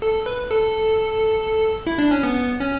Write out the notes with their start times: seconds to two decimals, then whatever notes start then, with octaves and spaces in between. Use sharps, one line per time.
0.02 A4
0.26 B4
0.51 A4
1.87 E4
1.98 D4
2.11 C#4
2.23 B3
2.60 C#4